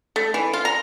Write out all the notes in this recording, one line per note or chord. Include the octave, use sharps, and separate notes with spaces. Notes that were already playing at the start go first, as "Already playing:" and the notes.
A3
E3
F4
A#5